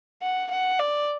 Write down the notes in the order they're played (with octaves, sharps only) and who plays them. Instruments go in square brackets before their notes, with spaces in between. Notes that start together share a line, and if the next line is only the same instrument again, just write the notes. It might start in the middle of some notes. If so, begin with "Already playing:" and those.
[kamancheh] F#5
F#5
D5